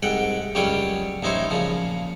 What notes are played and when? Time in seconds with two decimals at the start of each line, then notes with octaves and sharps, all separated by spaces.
0.03 C2 G#2 F#5 G5
0.55 C#2 F#2 G3 C#4 C#5 G5
1.23 A1 D#4 E4 C5 C#5
1.50 A#2 C#3 F3